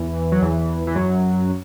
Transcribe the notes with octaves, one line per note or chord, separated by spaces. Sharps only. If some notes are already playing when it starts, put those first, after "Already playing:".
Already playing: E2 E3
F#3
E2 E3
E3
F#2 F#3